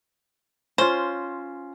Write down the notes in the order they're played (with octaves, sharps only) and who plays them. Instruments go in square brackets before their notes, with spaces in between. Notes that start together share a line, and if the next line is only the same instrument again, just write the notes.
[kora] C#4 F4 [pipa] C5